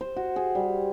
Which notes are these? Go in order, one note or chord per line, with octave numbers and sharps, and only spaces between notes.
C5
F#4
G#4
G3